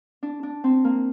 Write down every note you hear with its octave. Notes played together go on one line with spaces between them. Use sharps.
D4
D4
C4
A#3